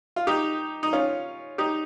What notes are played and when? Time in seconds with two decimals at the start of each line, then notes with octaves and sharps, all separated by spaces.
0.16 F4
0.27 D#4 G4
0.83 D#4
0.93 C#4 F4
1.58 D#4 G4